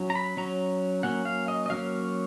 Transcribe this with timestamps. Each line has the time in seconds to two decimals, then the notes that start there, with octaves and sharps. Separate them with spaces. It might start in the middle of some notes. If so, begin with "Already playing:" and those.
Already playing: F#3 C#4
0.10 A#5
0.15 B5
0.37 F#3 C#4 A#5
1.03 F#3 A#3 C#4 F#5
1.25 F5
1.48 D#5
1.66 D#5
1.70 F#3 A#3 C#4 F5